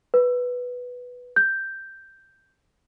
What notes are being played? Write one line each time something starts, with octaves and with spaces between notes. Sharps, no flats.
B4
G6